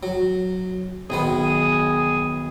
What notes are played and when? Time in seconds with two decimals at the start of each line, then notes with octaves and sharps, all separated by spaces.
0.03 F#3
1.10 B1 D#3 B3 G#4